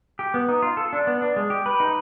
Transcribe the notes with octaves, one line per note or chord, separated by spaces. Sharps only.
G4
B3
D#4
F4
A4
D4
B3
D4
G#3
G4
B4
D#4